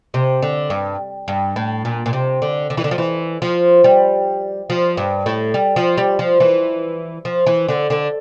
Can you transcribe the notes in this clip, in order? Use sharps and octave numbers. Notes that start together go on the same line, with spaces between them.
C3
D3
G2
G2
A2
A#2
A#2
C3
D3
D3
E3
D3
F3
E3
F3
G3
F3
G2
A2
G3
F3
G3
F3
E3
F3
E3
D3
D3